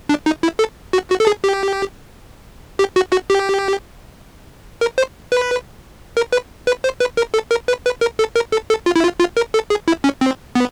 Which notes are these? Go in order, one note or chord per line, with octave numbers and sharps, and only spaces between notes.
D4
D#4
E4
A4
F#4
F#4
A4
G#4
G4
G4
F#4
F#4
G4
A#4
C5
B4
A#4
B4
B4
C5
B4
A#4
A4
A#4
B4
B4
A#4
A4
A#4
A4
A4
F4
E4
F4
F4
A#4
A4
G#4
E4
C#4
C4
B3